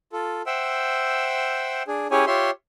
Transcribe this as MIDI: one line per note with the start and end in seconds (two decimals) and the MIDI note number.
0.13 0.42 65
0.13 0.42 69
0.46 1.83 72
0.46 1.83 76
0.46 1.83 78
0.46 1.83 79
0.46 1.83 88
1.88 2.07 62
1.88 2.07 68
2.11 2.25 61
2.11 2.25 64
2.11 2.25 67
2.11 2.25 68
2.11 2.25 73
2.11 2.25 80
2.27 2.51 65
2.27 2.51 67
2.27 2.51 73
2.27 2.51 76
2.27 2.51 84